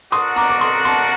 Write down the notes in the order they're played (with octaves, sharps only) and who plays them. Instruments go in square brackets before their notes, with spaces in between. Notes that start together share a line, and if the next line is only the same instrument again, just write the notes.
[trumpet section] D4 F#4 A#4 F#5 [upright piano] C6 D#6
[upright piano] A#5 D6
D6
C6 D#6
A5 C6